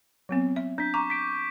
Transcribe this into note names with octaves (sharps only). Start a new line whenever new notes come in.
F#3 B3 C4
E5
D4 G6 B6
A#5 C#6 D6
B6 D7